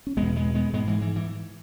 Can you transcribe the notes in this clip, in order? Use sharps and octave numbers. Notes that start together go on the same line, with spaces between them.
C#4
E2 B2 G#3 B3
G#3 B3
G#3 B3
G#2 G#3 B3
E3 G#3
E3
E3